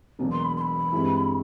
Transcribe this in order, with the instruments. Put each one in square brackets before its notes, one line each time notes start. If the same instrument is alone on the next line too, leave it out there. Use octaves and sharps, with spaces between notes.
[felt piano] E1 E2 B2 F#3 A#3
[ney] C6
B5
C6
B5
[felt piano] G2 E3 G#3 C4 E4